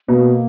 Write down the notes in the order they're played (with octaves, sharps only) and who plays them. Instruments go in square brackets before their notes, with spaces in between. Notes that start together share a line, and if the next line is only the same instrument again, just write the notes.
[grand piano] B2 [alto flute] A#3